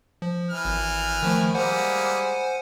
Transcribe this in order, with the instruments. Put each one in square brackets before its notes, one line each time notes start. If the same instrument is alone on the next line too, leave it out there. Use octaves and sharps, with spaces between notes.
[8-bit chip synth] F3
[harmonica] E3 F6
[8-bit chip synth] G#1
D#3 F3 A3
[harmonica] G3 G#3 A#3 [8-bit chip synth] C5 F#5 G#5